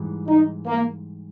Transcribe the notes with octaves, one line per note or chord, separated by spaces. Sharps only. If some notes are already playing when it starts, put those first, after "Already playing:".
Already playing: G#2 E3 G3
D#4
A#3